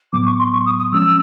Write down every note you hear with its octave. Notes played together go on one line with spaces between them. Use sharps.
A2 F#3 B3 D6
C#6
C6
C#6
D#6
D#6
F3 G#3 C#4 E6